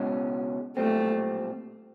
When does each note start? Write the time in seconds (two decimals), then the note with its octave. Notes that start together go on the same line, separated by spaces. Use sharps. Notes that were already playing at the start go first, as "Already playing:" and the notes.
Already playing: C#2 B2 G#3 C#4
0.77 B1 A#2 G3 A3 C4